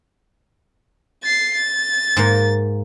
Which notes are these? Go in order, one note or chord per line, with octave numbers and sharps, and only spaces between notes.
A6 C7
A6
G#2 A#3